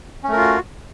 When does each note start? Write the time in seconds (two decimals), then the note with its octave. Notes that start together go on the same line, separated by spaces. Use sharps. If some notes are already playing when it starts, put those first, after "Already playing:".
0.24 C#4
0.28 A3
0.33 A#4
0.37 F4
0.41 F#4